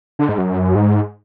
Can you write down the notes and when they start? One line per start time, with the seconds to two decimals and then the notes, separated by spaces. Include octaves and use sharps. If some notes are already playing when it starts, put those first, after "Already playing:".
0.19 D3
0.29 G#2
0.38 F#2
0.75 G#2